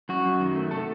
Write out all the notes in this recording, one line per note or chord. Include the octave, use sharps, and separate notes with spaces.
F#2 F#4
F#2
D#3
A3
C3 A4